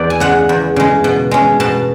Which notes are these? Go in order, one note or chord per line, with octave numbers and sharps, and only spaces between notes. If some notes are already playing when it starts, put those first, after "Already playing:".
Already playing: E2 B4 D5
G#5
C#3 G#3 F#5
E2
C#3 G#3
B2
G#3 C#4
B2 A5